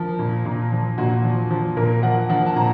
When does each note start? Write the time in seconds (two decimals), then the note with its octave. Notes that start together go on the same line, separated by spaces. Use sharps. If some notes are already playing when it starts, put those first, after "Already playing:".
Already playing: F3 A#4
0.19 A#2
0.45 A#2
0.72 F3
0.98 A#2 F#4
1.24 F3
1.50 F3
1.77 A#2 A#4
2.03 F3 F#5
2.29 F3 F#5
2.46 A5
2.56 A#2 A#5